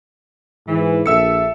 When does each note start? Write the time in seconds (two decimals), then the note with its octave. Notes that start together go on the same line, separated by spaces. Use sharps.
0.67 G#2 E3
1.06 A#1 A4 E5 E6 C#7